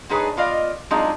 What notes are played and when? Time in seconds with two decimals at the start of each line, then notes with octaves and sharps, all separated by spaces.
0.09 D3 G#3 D#4 G#4 B4 C#5
0.37 B3 F4 D5 D#5 F5
0.91 F#3 G#3 C4 D4 D#4 F4